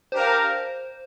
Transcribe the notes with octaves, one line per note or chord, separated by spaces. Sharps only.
D4 G4 A#4 C5 F5